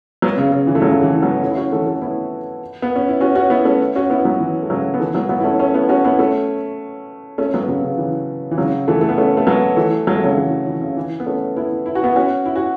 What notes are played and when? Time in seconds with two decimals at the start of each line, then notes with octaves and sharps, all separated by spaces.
0.22 F#3 B3
0.38 C#3
0.52 C#3
0.67 E3
0.75 A3
0.82 C#3 F#3
0.93 F#3
1.01 E3 A3
1.22 F#3 B3
1.35 E4
1.42 A3 C#4
1.50 E4
1.56 C#4 F#4
1.72 E3 A3
1.87 A3 C#4
2.02 B3 E4
2.82 B3
2.96 C#4
3.09 E4
3.21 C#4 F#4
3.35 C#4 F#4
3.50 B3 E4
3.65 A3 C#4
3.96 C#4 F#4
4.10 B3 E4
4.25 F#3 B3
4.40 E3
4.63 A3
4.70 C#3 F#3
4.94 B3
5.00 E3 A3
5.15 F#3 B3
5.29 F#3 B3
5.40 E4
5.44 A3 C#4
5.59 A3 C#4
5.74 B3 E4
5.89 C#4 F#4
6.04 B3 E4
6.19 A3 C#4
7.38 A3 C#4
7.54 F#3 B3
7.68 C#3 F#3
7.84 C#3
7.98 E3
8.51 E3
8.58 C#3 F#3
8.88 E3 A3
9.01 A3
9.09 B3
9.18 A3 C#4
9.37 A3
9.47 F#3 B3
9.77 E3 A3
10.07 F#3
10.15 A3
10.24 C#3 F#3
10.36 E3 A3
10.66 E3
10.81 C#3
10.97 E3
11.20 B3
11.26 A3 C#4
11.56 B3 E4
11.86 E4
11.95 F#4
12.04 B3 E4
12.16 C#4 F#4
12.46 E4
12.56 F#4